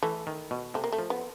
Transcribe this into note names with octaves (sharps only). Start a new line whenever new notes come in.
E3 A3
D#3
B2
C3 A3
A#3
A3
F3
B3